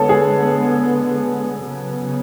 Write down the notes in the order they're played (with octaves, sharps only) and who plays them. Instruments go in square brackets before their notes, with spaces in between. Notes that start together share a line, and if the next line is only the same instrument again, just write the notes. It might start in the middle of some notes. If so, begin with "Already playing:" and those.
Already playing: [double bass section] D3 G#3 B3 [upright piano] A4 C#5
[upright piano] G#4
[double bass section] C#3 F#3 B3